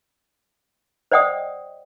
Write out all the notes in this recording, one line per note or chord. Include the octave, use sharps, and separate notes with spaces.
C5 D5 D#5 F#5 G5 D#6